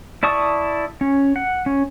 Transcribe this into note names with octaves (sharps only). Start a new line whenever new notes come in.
E4 D5 A5 C#6 D#6
C#4
F#5
C#4